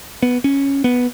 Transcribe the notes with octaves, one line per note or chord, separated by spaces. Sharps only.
B3
C#4
B3